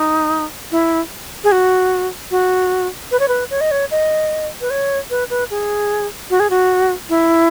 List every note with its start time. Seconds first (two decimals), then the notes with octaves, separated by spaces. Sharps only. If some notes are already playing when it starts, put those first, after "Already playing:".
Already playing: D#4
0.72 E4
1.44 G#4
1.52 F#4
2.31 F#4
3.11 B4
3.20 C#5
3.28 B4
3.50 C#5
3.61 D#5
3.71 C#5
3.91 D#5
4.61 B4
4.70 C#5
5.10 B4
5.30 B4
5.50 G#4
6.30 F#4
6.40 G#4
6.50 F#4
7.09 E4